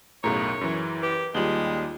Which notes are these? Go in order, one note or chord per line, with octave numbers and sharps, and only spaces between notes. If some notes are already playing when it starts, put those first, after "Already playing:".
B1 F#2 A2 G#4 A#4 C#5 A#5
F#2 E3
G4 B4
D#2 G3 G#3 F4 F#7 G7